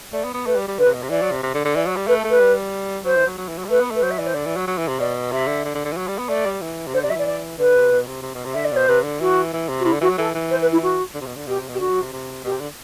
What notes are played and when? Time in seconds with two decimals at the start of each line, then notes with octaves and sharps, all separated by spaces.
0.13 A3 D5
0.24 B3
0.34 B3
0.46 A3 B4
0.56 G3
0.68 G3
0.78 D3 B4
0.86 C3
0.94 B2
1.03 C3
1.10 E3 D5
1.22 F#3
1.32 C3
1.43 C3
1.54 D3
1.65 D3
1.75 E3 D5
1.87 F#3
1.96 G3
2.07 A3 B4
2.18 A4
2.24 A3
2.29 B4
2.41 G3
3.04 F#3 C5
3.16 E3
3.26 F#3
3.38 F#3
3.48 E3
3.58 F#3
3.65 G3
3.69 A3 B4
3.80 B3
3.91 A3 B4
4.02 F#3 C5
4.10 E5
4.18 E3 D5
4.26 C5
4.34 D3 D5
4.46 E3
4.56 F#3
4.68 F#3
4.78 E3
4.88 C3
5.00 B2 D5
5.32 C3 E5
5.47 D3
5.65 D3
5.75 D3
5.85 D3
5.92 E3
5.97 F#3
6.08 G3
6.19 B3
6.29 A3 D5
6.46 G3
6.61 E3
6.87 C3
6.93 D3 C5
7.02 C3 D5
7.10 F#3 E5
7.15 E3 D5
7.26 D5
7.58 D3 B4
7.75 C3
7.92 B2
8.07 C3
8.23 C3
8.35 B2
8.45 C3
8.53 D3 E5
8.64 D5
8.72 B2 C5
8.88 C3 B4
9.04 D3
9.20 E3 F#4
9.53 E3
9.69 C3
9.79 F#4
9.85 C3 E4
9.93 D3
10.01 E3 F#4
10.09 F#3
10.17 E3 A4
10.35 E3
10.50 C5
10.61 B4
10.72 E4
10.82 F#4
11.14 D3
11.21 C3
11.26 B2
11.36 D3
11.47 B2 G4
11.58 C3
11.68 B2
11.74 G4
11.79 D3 F#4
11.90 F#3
12.01 C3
12.13 C3
12.44 B2 G4
12.52 C3
12.60 D3